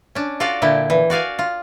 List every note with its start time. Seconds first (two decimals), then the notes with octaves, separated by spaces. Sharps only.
0.15 C#4 D4
0.40 F4 F#4 A4 D5 F5
0.62 A#2 D3 E4 G5
0.90 E3
1.10 F#4 D5 F5 G#5
1.39 F4